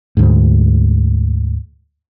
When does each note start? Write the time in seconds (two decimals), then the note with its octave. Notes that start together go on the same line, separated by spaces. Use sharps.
0.17 D2 G#2